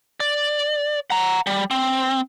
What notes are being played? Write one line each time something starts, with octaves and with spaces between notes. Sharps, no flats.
D5
F#5 A#5
G3
C4